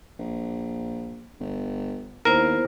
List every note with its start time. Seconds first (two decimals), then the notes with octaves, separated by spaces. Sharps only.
0.19 A#1
1.40 G1
2.25 D#2 B3 E4 A#4 C5